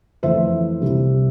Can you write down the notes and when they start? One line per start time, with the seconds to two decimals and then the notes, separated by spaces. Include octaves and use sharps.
0.23 F2 E3 A3 C5 E5
0.82 C2 C3 G3